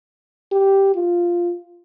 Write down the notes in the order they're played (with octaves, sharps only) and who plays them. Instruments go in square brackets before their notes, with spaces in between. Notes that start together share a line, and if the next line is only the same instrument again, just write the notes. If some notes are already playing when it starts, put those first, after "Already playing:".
[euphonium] G4
F4